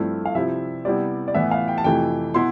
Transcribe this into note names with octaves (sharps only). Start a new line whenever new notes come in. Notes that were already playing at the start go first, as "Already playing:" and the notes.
Already playing: G2 F3 A3 C4 E4
F5
C3 F3 C4 E4 E5
C3 G3 B3 E4 D5
D5
A2 E3 B3 E5
F5
G5
A5
F2 C3 E3 A3 E4 G5
B2 B3 E4 C6